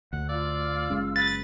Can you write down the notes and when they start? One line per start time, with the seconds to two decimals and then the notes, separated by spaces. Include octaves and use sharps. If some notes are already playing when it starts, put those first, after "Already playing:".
0.13 D2 F#5
0.29 F4 D5 F5 E6
0.90 F#1 G#3 C#4
1.16 B4 A6